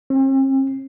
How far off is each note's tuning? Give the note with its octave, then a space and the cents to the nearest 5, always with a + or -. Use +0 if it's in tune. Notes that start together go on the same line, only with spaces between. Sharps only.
C4 +45